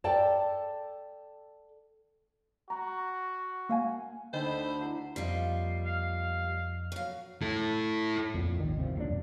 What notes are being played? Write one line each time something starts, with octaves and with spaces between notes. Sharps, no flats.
A4 D5 G5 A5
F#4 A#5
A#3 F5 G#5
D2 D3 D#4 A4 C5 D#5 G5 B5
E4 F#5
F2 F3 G3 A#3 F4 D#5 C6
F5
F#3 F5
E4 A4
F2 A#2
G#1 D#2 D#3
C3 D#3 F3
D#1 A#2 C#3 D4
F#2 B2